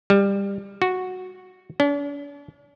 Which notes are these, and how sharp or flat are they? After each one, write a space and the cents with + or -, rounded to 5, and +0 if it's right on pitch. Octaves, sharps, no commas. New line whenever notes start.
G3 +20
F#4 -5
D4 -45